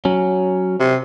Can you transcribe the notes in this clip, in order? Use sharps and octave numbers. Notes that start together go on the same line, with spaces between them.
F#3 C#4
C3